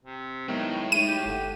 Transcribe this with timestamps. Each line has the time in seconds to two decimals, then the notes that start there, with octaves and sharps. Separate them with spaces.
0.04 C3
0.48 A2 D#3 F#3 G#3 B3
0.92 G#3 D#4 D#7
1.08 G4
1.26 G1 A4 F#5